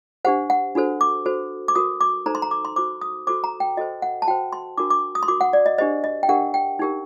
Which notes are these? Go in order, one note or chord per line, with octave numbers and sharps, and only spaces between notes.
D4 G4 C5 F#5
F#5
D4 F#4 A4 C5
D6
F#4 A4 C5
D6
F#4 A#4 D#6
D6
D#4 A4 C5 A#5
C6
A#5
D6
C6
F#4 C5 D6
D#6
F#4 A4 C5 D6
A#5
G5
F#4 A4 C5 D#5
F#5
A5
F#4 C5 G5
C6
D4 F#4 A#4 D6
D6
D#6
C6
F#4 A#4 D6
F#5
D5
D#5
D4 G4 C5 D#5
D#5
G5
D4 G4 A#4 F#5
G5
D#4 G4 A#4